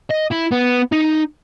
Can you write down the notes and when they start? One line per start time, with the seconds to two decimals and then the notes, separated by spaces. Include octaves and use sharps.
0.10 D#5
0.31 E4
0.51 B3
0.92 D#4